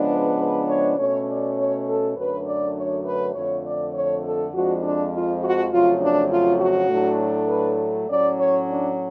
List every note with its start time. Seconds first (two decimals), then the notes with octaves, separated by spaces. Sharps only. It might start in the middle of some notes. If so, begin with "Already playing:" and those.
Already playing: C#3 F3 G#3 B3 D4
0.09 B4
0.38 B4
0.68 C#5
0.98 B2 A3 C#4 C#5
1.27 D5
1.57 C#5
1.87 A4
2.16 F#2 D3 F#3 A3 D4 B4
2.46 D5
2.75 C#5
3.05 B4
3.34 F2 D3 F3 A3 C#5
3.64 D5
3.94 C#5
4.23 A4
4.52 F2 F3 G#3 D4 F#4
4.82 D4
5.12 F4
5.42 F#4
5.71 F2 C#3 F#3 A3 F4
6.00 D4
6.30 F4
6.60 F#4
6.89 A2 F#3 A3 D4
7.49 B4
8.07 A2 F#3 C#4 D5
8.37 C#5
8.67 D4